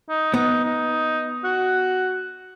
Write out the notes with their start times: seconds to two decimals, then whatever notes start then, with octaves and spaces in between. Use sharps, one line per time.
0.09 D#4
0.34 B3 D#4
0.64 D#4
1.44 F#4